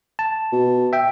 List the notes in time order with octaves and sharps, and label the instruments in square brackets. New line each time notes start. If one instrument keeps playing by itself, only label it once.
[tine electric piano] A5
[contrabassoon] B2
[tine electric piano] E5 G5